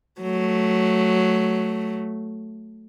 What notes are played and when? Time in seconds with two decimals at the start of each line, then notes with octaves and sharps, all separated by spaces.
0.21 F#3 A3